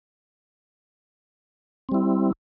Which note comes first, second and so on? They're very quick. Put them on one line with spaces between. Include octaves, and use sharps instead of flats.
C4 G3 E4